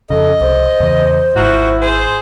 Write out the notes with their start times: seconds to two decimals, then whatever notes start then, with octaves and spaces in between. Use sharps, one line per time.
0.10 F2 C#3 A4 D#5
0.41 C2 C5
0.80 E2 C#3 E3
1.36 G#1 G#2 F3 E4 F#4
1.81 G#4 C5